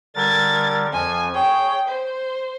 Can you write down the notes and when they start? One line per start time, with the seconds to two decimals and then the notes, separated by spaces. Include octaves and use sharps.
0.15 D3 G3 A#4 G#6 A6
0.92 F2 F3 G#5
1.34 G#4 C#5 G5
1.88 C5 G6